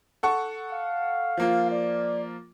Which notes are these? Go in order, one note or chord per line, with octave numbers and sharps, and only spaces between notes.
A4 F#5 C#6
F5
F3 A#3 F4
D5